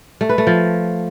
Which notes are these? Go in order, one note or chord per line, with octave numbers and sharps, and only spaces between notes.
A3
B4
A3
F3